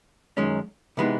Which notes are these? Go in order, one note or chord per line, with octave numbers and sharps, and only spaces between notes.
F#2 D#3 G#3 C#4
C3 E3 G#3 B3 D#4